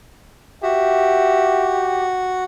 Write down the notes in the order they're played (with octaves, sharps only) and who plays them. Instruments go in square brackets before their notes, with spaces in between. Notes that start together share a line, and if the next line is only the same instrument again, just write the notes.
[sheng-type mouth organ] F#4 [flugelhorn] G4 [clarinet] E5